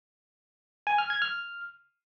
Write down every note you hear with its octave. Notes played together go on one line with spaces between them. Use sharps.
G#5
F6
G#6
F6